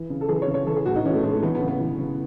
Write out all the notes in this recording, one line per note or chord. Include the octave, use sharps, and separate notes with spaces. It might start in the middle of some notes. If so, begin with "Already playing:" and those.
Already playing: E3
C#3
A4
E3 G#4
C#5
C#3
C#5
E3 A4
G#4
A2 F#4
D#4
E3 C#4
A3
A2 G#3
A3
E3 B3
B3
C#3
B3
E3
C#3